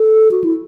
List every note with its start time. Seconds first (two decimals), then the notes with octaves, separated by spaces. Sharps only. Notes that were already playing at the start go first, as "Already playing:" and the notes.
Already playing: A4
0.31 F#4
0.44 E4